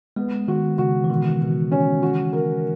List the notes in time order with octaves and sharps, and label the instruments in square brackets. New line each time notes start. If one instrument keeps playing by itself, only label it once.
[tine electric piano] G#3 [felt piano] B3
[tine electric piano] D#3 [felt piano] F#4
[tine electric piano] C#3 [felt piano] F#4
[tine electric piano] E3
[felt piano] B2 [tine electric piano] D#3
[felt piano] B2
C#4
F#4
A#4